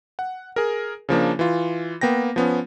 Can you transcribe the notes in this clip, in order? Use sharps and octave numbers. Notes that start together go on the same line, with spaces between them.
F#5
G#4 A#4
C#3 F3 A#3 D4
E3 F4
A#3 B3 G5 A#6
F3 B3 C#4